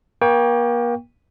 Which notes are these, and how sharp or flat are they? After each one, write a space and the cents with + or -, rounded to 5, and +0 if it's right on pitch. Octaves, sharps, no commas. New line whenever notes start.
A#3 +40 G5 +20 C#6 +30